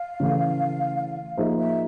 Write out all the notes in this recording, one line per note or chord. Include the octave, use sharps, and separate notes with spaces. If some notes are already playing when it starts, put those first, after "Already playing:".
Already playing: F5
C#3 E3 A3
F3 A#3 D#4 G#4 C5 E5
E5